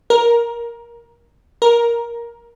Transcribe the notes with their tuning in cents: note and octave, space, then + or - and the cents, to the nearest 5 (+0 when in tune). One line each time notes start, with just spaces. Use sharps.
A#4 +10
A#4 +10